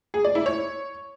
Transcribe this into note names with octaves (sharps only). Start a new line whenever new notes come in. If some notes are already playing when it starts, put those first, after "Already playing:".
G#4
D5
E4
C#5